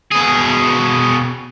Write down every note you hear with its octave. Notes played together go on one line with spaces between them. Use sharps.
B2 G#4